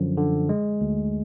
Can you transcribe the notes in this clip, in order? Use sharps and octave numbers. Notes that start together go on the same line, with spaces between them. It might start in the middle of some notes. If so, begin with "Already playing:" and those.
Already playing: F#2 D3 F3
D3
G#3
D2